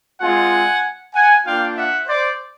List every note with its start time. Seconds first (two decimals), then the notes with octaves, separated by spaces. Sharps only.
0.21 G#3 C4 F4 F#5 G#5
1.14 F#5 G#5
1.46 A#3 D4 F4 F5 G5
1.77 E5 F#5
2.08 C5 D5